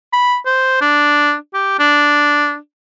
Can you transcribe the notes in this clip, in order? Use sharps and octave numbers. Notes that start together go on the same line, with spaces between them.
B5
C5
D4
G4
D4